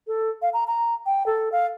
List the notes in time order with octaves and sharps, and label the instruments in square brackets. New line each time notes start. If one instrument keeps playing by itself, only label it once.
[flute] A4
F5
A#5
A#5
G5
A4
F5